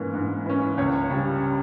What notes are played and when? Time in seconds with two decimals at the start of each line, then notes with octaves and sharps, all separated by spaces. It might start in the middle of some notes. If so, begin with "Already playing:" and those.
Already playing: G#2 E3 A#3 C#4
0.14 G#2
0.46 E3 A#3 C#4
0.77 C#2 C#5
1.10 C#3 G3 C#4